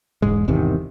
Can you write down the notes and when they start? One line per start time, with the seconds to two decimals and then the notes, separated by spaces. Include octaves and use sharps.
0.22 E1 G#2 G#3
0.48 G#1 E2 C3 D#3